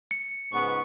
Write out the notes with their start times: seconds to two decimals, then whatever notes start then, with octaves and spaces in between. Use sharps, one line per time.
0.11 C#7
0.53 C#2 G#2 B3 C#6